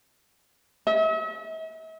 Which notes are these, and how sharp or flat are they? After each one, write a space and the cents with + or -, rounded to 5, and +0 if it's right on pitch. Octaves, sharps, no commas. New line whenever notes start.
E5 -45